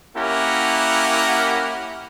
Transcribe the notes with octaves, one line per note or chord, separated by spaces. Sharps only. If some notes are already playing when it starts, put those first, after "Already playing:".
A#3 C#4 E4 G4 A#4 F#5